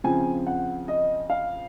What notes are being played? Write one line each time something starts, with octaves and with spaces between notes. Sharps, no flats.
C#3 F3 C4 G#5
F#5
D#5
F5